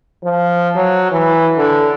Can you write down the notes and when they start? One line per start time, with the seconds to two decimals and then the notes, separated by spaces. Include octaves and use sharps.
0.25 F3
0.76 F#3
1.11 E3
1.57 D3